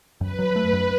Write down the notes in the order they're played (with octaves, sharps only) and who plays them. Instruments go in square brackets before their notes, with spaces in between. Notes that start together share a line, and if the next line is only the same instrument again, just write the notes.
[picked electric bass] F#2 [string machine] B4
[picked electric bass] F#3
A3
F#2